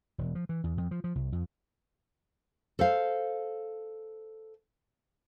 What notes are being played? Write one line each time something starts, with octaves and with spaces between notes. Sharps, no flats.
E1
F3
E3
E2
F2
F3
F3
C2
F2
A4 C5 E5 F5